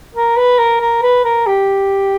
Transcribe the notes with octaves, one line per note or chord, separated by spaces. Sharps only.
A#4
B4
A#4
A#4
B4
A#4
G4